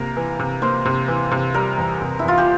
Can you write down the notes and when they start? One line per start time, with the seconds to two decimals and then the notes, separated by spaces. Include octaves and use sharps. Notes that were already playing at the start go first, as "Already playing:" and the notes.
Already playing: C3 A#3 A#4
0.17 E3
0.39 C3
0.62 A#3 C5
0.85 C3
1.08 E3
1.31 C3
1.54 G3 A#4
1.78 E2
2.01 C3
2.19 E4
2.24 E2 F4
2.38 G4